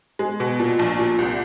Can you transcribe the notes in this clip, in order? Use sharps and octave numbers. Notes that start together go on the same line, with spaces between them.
G#3
B2
A#2
A#1
A#2
C2